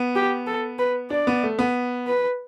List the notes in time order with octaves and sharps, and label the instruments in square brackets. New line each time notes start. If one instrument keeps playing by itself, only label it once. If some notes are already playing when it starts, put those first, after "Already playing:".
Already playing: [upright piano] B3
[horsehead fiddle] G4
A4
B4
[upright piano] D4 [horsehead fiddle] D5
[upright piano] B3
A3
B3
[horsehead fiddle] B4